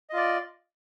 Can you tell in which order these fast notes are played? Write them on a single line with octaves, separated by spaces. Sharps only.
D#5 F4 D5